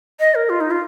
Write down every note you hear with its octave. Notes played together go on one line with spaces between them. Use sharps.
D#5
A#4
F4
D#4
F4